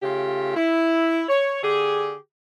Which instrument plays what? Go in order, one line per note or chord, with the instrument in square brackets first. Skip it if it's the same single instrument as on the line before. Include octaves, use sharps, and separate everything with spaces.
[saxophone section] C#3 A3 F4 G4
E4
C#5
D3 G4 G#4